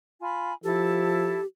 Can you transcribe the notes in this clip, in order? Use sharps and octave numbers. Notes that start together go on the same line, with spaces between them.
F4 G#5 B5
F3 E4 G4 A4 A5